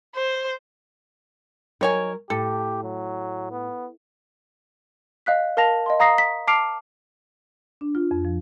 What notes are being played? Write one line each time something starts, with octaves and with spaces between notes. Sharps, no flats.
C5
D#3 F#3 A#4 C#5 G#5
A2 G4 A4
F#3
B3
D#5 F5 F#6 B6
A#4 F5 A5 A#6 F7
D#5 F5 C6
F5 A#5 D#6 A#6 C7
B6
A5 D6 F6 C7 D7 F7
D4
F4
F2
F3